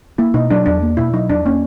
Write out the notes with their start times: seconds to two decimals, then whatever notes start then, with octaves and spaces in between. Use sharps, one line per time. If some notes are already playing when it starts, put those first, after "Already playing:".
0.18 A#3 E4
0.34 B2 D#4
0.50 F#3 D4
0.66 E2 D4
0.82 A#3
0.97 B2 E4
1.13 F#3 D#4
1.30 E2 D4
1.45 A#3 C#4